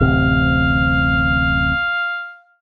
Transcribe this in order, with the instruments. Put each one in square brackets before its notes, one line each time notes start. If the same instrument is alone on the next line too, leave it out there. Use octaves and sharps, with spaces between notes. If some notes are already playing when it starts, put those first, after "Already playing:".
[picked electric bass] D1 A1 C3 [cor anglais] F5